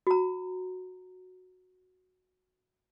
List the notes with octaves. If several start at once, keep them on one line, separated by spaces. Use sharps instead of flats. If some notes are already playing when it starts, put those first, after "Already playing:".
F#4 A#5